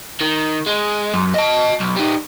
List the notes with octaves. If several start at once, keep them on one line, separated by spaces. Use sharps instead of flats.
D#3
G#3
F#2
D#5 A5
B1
G3 D#4